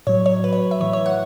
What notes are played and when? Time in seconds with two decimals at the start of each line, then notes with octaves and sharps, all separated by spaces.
0.07 A2 F#3 C#5
0.26 C#5
0.44 B4
0.53 C#5
0.71 E5
0.80 A2 E3 C#5
0.93 C#5
1.06 F#5